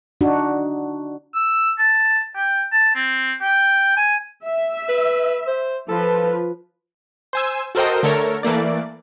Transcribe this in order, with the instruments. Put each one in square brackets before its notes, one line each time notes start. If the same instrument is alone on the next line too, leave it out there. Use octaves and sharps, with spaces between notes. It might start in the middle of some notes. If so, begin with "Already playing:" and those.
[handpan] D4 D#4 F#4
[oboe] E6
A5
G5
A5
C4
G5
G#5
[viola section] E5
[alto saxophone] B4
C5
[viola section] F3 F4 B4 [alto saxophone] A4
[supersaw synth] C5 G#5 E6
F#4 A4 A#4 C5 D#5 G5
D3 A3 A4 A#4 C#5
E3 A3 A#3 D5